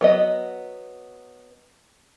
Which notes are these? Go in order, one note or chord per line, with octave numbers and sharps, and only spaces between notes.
F#3 B3 D#5